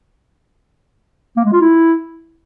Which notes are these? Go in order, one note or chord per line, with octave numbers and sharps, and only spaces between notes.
A#3
G#3
F4
E4